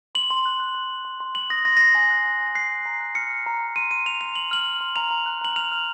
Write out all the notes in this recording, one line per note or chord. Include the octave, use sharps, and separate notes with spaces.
C6 F#7
C6
F#6
F#6
C6
C6
C6
C6
C6 F#7
D#6 A#6
C6 A#6
A#6
C6 C7
G#5 A#6
F#6
G#5
G#5
A#6
F#6 C7
F#6
A#5
F#6
F6 C#7
F6
A#5
A#5
C6 D#7
C6 D#7
C6 F7
C6 F7
C6 F#7
F6 F#7
F6
C6
A#5 F7
A#5
F#6
A#5 F#7
F6 F7
F6